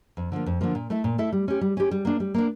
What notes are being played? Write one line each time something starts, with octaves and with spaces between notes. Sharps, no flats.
F2
D3 F3 A#3
F2
D3 F3 A#3
A#2
A3 E4 A4 E5
A#2
A3 E4 A4 E5
G3
C#4 G4
G3
C#4 G4
G3
A#3 D4
G3
A#3 D4